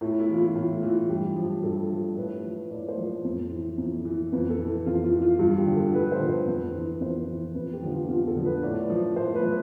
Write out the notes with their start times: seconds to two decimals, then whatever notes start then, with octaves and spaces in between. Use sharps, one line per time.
0.01 A2 E4
0.20 E4
0.29 E3 F4
0.38 E4
0.55 A2 F4
0.82 E3 F4
1.09 G2 G4
1.36 F3
1.63 G2 A4
1.90 F3
2.16 A2 B4
2.44 F3
2.70 A2 D5
2.89 C5
2.97 F3
3.25 F2
3.52 E3
3.78 F2
4.05 E3
4.32 F2 B4
4.50 A4
4.59 E3
4.86 F2 F4
5.04 F4
5.13 E3
5.22 F4
5.39 G2 F4
5.58 G4
5.66 D3 F3
5.76 A4
5.94 G2 B4
6.12 C5
6.20 D3 F3
6.29 C5
6.47 F2 B4
6.74 E3
7.01 F2 C5
7.28 E3
7.55 F2 B4
7.73 G4
7.82 D3 F3
7.91 F4
8.08 F2 F4
8.27 A4
8.36 D3 F3
8.45 B4
8.63 A2 D5
8.90 F3
9.16 A2 C5
9.35 B4
9.43 F3